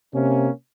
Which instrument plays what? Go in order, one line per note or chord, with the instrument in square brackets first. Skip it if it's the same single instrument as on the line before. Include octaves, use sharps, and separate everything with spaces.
[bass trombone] C3 [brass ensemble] A#3 C#4